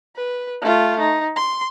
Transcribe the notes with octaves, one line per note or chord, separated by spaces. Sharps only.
B4
A3 F4
D#4
C6